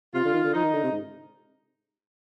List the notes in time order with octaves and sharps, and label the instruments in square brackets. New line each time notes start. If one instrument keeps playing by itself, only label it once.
[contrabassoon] C3 [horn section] F4
[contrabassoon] D3
D#3
D3
[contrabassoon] F3 [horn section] D#4
[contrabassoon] D#3
D3
C3
G#2